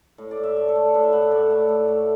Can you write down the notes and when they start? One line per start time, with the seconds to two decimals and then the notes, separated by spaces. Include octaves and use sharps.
0.18 A2
0.31 D5
0.37 A2
0.43 E5
0.56 A3 D5
0.68 A4
0.75 A3
0.94 A2 B4
1.03 E5
1.13 A2 F#5
1.22 E5
1.31 A3 D5
1.50 A3
1.69 A2
1.88 A3